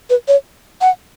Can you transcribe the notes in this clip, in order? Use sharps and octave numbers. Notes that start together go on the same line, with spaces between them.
B4
C#5
F#5